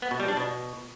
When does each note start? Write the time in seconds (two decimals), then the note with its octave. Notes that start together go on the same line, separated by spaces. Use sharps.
0.02 B3
0.11 B2
0.20 G3
0.28 D4
0.37 B2